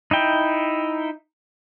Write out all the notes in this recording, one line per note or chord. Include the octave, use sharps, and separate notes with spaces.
D#4 E4 G5